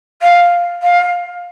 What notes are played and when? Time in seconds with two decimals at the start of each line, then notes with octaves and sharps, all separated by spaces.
0.22 F5
0.83 F5